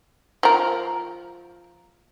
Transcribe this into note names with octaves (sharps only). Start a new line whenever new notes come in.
F3 A#4